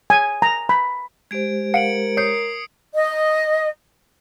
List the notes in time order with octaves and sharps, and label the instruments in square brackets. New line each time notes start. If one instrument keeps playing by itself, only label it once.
[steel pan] G#5
A#5
B5
[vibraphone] G#3 G4 C5 [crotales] G#6 D7
[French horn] A#4 [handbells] F5 F#5 [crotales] C#7 D7 F#7
[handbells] C#5 G6 [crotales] D#6 C7 C#7
[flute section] D#5